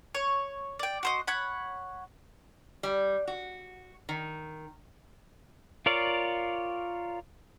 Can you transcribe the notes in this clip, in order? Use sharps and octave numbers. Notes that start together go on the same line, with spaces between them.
C#5
D5 G5
F#4 C5 D#5
C#5 F#5 B5
G3
F#4
D#3
F4 A#4 C#5 D5 F5